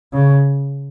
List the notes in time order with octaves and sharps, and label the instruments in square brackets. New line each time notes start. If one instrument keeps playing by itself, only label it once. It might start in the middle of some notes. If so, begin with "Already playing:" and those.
[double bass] C#3